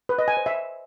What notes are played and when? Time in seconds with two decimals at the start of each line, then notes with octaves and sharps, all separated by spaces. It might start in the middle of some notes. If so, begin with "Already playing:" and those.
0.09 B4
0.19 D#5
0.28 G#5
0.37 C5
0.46 E5